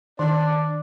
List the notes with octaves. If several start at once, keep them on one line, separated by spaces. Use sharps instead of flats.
D#3 D4 D5